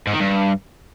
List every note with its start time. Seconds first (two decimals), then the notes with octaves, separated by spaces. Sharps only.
0.07 G#2
0.14 D#3
0.20 G2